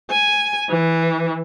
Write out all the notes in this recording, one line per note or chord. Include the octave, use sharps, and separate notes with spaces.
G#5
E3